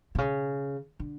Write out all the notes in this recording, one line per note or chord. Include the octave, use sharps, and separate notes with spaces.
C3
C#3
D3